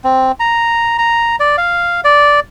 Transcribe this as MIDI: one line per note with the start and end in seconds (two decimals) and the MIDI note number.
0.04 0.32 60
0.40 0.97 82
0.99 1.36 82
1.40 1.56 74
1.58 2.01 77
2.04 2.40 74